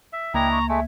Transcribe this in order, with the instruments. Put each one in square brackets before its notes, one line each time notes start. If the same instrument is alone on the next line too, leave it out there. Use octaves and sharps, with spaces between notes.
[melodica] E5
[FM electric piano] C#2 A#3 G#6 [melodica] D4 E4 D#5 [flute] G5 [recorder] A#5
[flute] C#6
[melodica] G#3 A3 [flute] E5